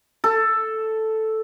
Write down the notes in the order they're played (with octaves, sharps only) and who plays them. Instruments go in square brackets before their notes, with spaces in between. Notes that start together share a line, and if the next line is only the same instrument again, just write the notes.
[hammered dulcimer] A4